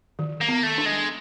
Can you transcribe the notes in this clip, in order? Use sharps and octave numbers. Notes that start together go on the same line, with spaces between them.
D#3
A#3
B3
A3
D4
G#3